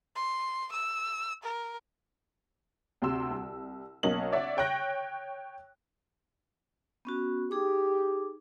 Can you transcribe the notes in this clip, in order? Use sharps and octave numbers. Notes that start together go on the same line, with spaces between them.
C6
E6
A#4
D2 C3 C6 E6
C2
B1 A#3 C#4 D#5 F#7
C#5 D5 E5 F#5
C#5 G5 C#6 F#6 A#6
B3 C#4 F#4
D#4 G4 G#4 D6